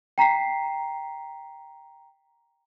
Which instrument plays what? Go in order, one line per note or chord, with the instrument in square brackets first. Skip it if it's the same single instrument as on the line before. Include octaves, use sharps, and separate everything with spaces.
[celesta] G5 A#5 B6 C7